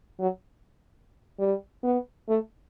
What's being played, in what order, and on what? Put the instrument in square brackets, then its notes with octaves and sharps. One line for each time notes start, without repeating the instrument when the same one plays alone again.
[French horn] F#3
G3
B3
A3